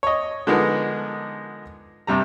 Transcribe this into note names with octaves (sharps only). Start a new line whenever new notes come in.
C#5 D#5
D3 F3 G#3 B3 D#4 A#4
G2 C3 G3 A#5